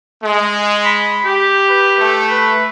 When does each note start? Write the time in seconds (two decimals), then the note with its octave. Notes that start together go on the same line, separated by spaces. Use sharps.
0.24 G#3
0.85 B5
1.26 G4
1.67 B4
1.98 A3
2.31 B4